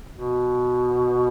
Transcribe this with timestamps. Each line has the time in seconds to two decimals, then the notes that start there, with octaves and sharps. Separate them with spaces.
0.16 B2